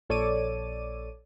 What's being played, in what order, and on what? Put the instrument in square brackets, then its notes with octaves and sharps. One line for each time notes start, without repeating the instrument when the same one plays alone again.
[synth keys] A#1 A4 C#5 D5 D6 D#7